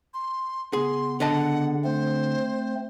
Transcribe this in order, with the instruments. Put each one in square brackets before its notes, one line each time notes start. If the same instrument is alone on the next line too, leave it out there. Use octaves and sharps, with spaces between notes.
[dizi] C6
[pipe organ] C#3 B3 [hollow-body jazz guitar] G#4 [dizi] C6
[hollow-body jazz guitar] D3 D#5 A5 [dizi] F#5
[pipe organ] A3 C4 [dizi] C5